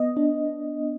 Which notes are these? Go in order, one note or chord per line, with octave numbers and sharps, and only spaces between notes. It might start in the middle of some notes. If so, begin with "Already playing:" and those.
Already playing: B3 D#5
D4